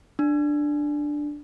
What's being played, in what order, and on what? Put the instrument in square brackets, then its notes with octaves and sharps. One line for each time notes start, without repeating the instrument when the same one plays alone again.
[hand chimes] D4